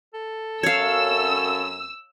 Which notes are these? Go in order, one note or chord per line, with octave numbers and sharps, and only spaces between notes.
A4
F#2 C#5 F5 E6